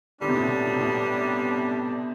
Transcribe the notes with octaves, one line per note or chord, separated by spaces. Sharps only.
A2 D3 G3 B3 D4
C3
B2
C3
B2
C3
B2